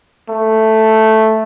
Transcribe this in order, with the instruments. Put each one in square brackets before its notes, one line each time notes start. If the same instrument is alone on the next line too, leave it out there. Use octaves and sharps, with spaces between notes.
[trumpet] A3